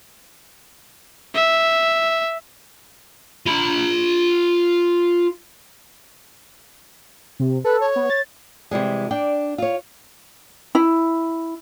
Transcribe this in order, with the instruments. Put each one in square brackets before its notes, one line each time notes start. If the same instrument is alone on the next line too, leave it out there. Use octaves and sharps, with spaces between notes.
[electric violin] E5
[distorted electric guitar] F4 B5
[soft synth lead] C3
[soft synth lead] A4 [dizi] B4
[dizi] C#5
[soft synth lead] B3
A6
[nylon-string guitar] C3 E3 G3 G#3
D4 D5 G5
F4 C#5
[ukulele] E4